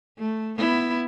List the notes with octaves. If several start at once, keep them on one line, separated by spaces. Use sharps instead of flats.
A3
B3 E4